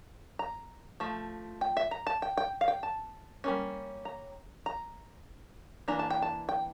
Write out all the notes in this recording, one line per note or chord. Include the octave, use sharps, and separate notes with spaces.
A#5
F3 A3
G5
E5
A#5
A5
G5
G5
F5
G5
A5
G3 A#3 C#4
A#5
A#5
E3 A#3 D4 A#5
A5
G5
A5
G5